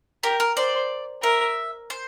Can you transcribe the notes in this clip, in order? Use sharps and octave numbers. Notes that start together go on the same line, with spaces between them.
G4 A#4
A#4
C5 D5
A#4 E5
C5